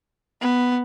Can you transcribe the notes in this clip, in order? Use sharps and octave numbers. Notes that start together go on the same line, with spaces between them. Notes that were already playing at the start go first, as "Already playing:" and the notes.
B3